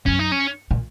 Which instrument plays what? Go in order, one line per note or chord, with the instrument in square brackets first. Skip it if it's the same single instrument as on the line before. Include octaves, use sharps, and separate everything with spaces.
[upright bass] F#2 [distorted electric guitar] C#4
[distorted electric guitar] D#4
C#4
[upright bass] A#2